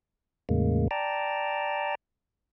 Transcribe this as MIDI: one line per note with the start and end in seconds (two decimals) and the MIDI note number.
0.49 0.88 40
0.49 0.88 45
0.49 0.88 49
0.49 0.88 56
0.49 0.88 58
0.91 1.95 74
0.91 1.95 79
0.91 1.95 81
0.91 1.95 82